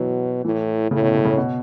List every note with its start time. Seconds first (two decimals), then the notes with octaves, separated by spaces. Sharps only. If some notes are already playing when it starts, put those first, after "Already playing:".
Already playing: B2 E3 F#3
0.45 A2 E3
0.91 A2 C#3
1.02 B2
1.15 C#3
1.25 C#3
1.37 B2